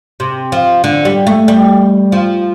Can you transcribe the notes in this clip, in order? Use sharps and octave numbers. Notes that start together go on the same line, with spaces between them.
C3
F3
D3
G3
A3
G3
F3